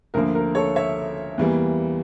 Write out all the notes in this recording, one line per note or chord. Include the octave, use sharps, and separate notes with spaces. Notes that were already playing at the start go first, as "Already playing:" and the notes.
D2 D3 F3 A#3 A#4
A#4
A4 C#5
C#5 E5
E2 E3 G3 A#3